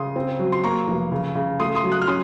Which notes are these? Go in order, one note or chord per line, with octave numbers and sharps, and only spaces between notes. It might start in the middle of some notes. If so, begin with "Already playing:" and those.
Already playing: C#3 C6 D#6
C4
F#3
C6
A#3 A#5 C#6
F1
C#3
C#3
A3 C6 D#6
C6 D#6
F#3
D#6 F#6
F6
C#4 C6 D#6